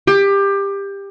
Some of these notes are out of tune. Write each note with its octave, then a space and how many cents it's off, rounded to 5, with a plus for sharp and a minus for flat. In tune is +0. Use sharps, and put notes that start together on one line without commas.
G4 +20